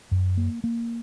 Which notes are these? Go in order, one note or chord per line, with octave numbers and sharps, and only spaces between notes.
F#2
A#3
A#3